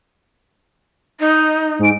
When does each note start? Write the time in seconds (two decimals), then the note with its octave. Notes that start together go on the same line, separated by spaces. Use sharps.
1.20 D#4
1.79 G#2 D7